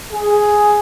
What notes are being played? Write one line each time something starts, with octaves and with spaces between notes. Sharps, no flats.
G#4